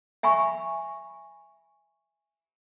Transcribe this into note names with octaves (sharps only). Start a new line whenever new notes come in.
E5 G#5 B5 C#6